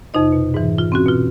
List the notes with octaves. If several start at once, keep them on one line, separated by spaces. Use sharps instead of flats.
F2 C3 D#4 D#5
B2
G#2 E3
F4
C4 C#4 F#4
B2 F4